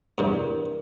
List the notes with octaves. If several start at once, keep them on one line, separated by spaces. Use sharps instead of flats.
E2 G2 C3 A#4